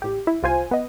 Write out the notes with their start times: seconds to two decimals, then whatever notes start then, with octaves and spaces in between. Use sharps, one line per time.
0.02 A1 G4
0.27 E4
0.43 C2 F4 C5 G#5
0.71 B3 D#5